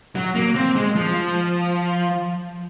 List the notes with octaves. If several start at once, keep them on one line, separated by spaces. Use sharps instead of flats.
F#3
A#3
C4
G#3
F3